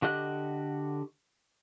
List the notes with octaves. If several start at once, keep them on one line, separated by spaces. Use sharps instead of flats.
D3 F#4 G4 D#5 F#6